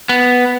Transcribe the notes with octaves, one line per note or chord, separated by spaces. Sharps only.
B3